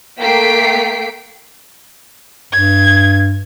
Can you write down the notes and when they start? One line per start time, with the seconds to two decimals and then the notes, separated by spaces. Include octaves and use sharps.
0.21 A3 A#3 G5 B6 C7 D7
2.53 G2 G#6